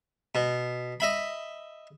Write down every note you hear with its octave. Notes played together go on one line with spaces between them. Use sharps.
B2
D#5 E5 B5